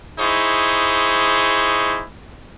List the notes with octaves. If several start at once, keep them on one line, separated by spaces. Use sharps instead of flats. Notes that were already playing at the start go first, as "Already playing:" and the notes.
D#4 E4 G#4 C5 C#6